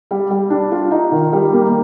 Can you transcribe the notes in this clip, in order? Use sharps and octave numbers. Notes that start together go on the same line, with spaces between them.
G3
G3
D4
F4
D#4
D#3
G3
A#3